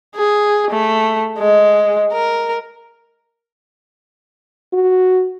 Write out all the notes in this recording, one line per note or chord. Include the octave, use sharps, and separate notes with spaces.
G#4
A3
G#3
A#4
F#4